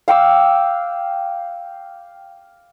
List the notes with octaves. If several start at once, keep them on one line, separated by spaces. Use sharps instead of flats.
F5 G5 D6 E6